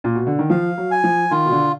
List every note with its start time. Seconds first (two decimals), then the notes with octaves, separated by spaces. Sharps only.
0.04 A#2
0.15 B2
0.27 D3
0.39 D#3
0.50 F3 F5
0.78 F#3
0.91 G#5
1.04 F3
1.31 D#3 F4
1.46 B2
1.51 D3